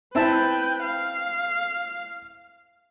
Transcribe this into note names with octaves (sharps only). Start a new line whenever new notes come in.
C4 E4 B4 G5 A5
F5